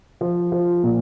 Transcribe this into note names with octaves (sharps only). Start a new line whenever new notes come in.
F3
F3
A#2